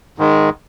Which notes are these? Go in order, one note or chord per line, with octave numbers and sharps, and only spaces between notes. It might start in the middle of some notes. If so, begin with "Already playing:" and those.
G#2 D#3 G#3